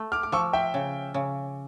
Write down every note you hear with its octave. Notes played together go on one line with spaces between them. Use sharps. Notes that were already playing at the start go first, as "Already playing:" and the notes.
Already playing: A3
D6 F6
D6
F3 C#6 E6
E5 G5
C#3
C#3